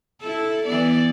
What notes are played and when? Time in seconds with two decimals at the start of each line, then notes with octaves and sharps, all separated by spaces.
0.21 E4 A4
0.66 E3 B3 D5